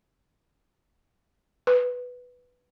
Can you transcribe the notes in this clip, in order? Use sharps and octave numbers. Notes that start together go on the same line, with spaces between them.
B4